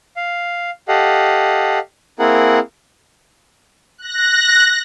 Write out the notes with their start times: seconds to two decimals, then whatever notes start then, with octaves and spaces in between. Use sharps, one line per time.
0.17 F5
0.88 G4 A4 D#5 F5 F#5
2.19 A#3 C4 E4 G#4 A#4 F#5
3.98 F#6 A#6